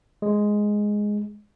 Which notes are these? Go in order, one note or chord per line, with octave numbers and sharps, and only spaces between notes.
G#3